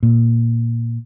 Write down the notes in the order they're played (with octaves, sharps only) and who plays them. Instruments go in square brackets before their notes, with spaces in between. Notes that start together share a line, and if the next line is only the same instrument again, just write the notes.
[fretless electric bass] A#2